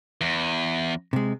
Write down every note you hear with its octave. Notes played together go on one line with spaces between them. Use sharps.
E2
C3 G#3